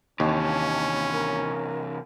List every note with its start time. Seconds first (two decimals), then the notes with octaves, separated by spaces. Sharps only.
0.20 D#2 C3 E3 C#4 A5
1.13 A#4